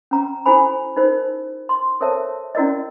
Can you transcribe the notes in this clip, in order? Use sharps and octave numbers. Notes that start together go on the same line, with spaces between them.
C#4 A#5
E4 F#4 A4 C5 G#5 B5
D#4 F4 A#4 C5
C6
A4 A#4 C5 C#5 E5 A5
C#4 E4 F#4 A#4 D5 D#5